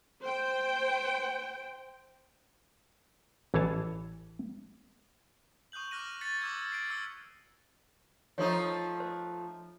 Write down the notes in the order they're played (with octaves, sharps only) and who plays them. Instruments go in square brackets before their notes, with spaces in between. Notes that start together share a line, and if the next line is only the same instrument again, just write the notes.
[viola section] C5 G5
[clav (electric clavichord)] A1 E3 G#4 C#5 A5
[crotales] C#6 D#6 F#6 G6 F#7
D6 F6 F#6 A#6 D#7
A6 B6 C#7
D6 E6 G#6
C7 D7 F#7
D6 E6 F6 C#7 G7
[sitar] F3 A3 D#4 [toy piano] C#5 C6
[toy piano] C5